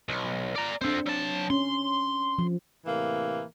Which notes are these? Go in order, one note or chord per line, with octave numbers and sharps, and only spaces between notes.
B1
D5 A#5
C4 D4 A4 C5
F#3 A5
C#4 C6
F3
A2 C3 E3 A#3